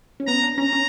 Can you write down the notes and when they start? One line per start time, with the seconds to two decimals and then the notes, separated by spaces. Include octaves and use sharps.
0.20 C#4
0.27 B3 A#5
0.42 D4
0.58 C#4 A#5
0.73 C#4